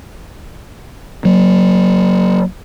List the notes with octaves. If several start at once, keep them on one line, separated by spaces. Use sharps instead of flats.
F#3 A#3